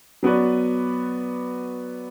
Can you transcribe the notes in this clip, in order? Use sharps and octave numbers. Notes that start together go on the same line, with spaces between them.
F#3 B3 F#4 B4 D5